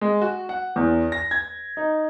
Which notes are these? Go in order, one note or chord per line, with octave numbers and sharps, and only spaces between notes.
G#3
F#4
F#5
E2
A#6
G#6
D#4